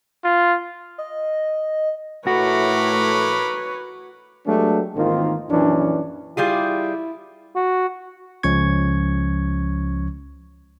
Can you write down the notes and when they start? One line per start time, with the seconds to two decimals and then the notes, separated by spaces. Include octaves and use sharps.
0.24 F4
0.98 D#5
2.27 A2 A3 F#4 A#4 B4 C#5 B5 D6
4.46 F#3 G#3 A3 B3 D4 G4
4.96 G#1 D#3 E3 A#3 C4 F4
5.49 A#1 F#2 E3 C#4 D4
6.37 G3 E4 F4 G#4
7.55 F#4
8.43 C#2 F3 C#4 C#6 G#6